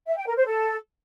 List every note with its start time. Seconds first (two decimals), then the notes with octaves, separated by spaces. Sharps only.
0.06 E5
0.16 G5
0.26 A#4
0.36 C5
0.46 A4